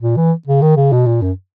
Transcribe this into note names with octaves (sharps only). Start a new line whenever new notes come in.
A#2
E3
C#3
D#3
C#3
B2
A#2
F#2